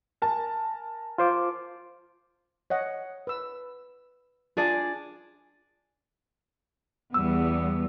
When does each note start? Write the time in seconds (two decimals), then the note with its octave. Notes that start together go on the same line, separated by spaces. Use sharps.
0.22 A#4 G#5 A5
1.18 F4 C5 D6
2.70 C#5 D#5 F#5
3.27 B4 E6
4.57 D4 F4 G#4 D5 A5
7.14 E2 G3 B3 E6